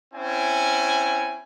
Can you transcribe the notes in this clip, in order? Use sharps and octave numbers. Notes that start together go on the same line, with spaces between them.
C4 C#4 E4 G#5